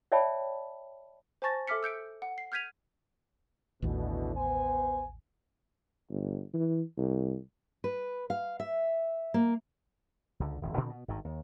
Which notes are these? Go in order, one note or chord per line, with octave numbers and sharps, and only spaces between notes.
C#5 D5 E5 G5 A5 B5
C5 G#5 A5 C#6 A6 A#6
A4 E5 D6 F6 B6 C#7
E6 G6 C#7 D7
F#5
C7
F6 G6 G#6 B6 D#7 F7
A1 D#2 B2 D3 E3
B3 C5 G#5
G1
E3
C2
B4
F5
E5
A#3
C#2 D3
D#1 G#1 F2
A#2 D3 E3 C4
B2
G#1 G2 D#3
D#2